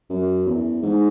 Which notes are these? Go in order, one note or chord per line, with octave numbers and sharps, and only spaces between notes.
F#2
E2
G#2